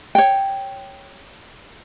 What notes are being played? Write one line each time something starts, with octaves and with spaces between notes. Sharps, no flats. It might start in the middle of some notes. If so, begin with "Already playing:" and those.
C#5 G5